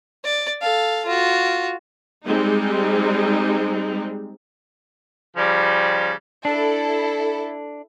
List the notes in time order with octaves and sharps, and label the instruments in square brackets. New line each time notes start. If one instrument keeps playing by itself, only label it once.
[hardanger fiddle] D5
A4 F5
F4 F#4
[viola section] G3 G#3 C4 D#4
[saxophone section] C#3 F3 G3
[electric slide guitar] D4 [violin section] E4 A4